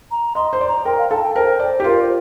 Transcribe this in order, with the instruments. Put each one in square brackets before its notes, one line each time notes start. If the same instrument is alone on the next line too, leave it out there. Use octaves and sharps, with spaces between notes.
[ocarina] A#5
[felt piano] D#5 [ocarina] C6
[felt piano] C5 [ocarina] C6
[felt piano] D5
[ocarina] A#5
[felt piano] A#4 [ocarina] G5
[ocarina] F5
[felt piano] A4 [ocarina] F5
[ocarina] A5
G5
[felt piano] A#4 [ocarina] C5
[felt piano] D5
G4
[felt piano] F4 [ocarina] A#4
[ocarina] C5